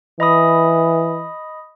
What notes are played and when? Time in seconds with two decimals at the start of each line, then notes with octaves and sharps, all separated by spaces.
0.20 E3 D#5 B5 D#6